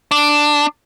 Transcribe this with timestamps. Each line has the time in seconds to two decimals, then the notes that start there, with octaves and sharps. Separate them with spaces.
0.11 D4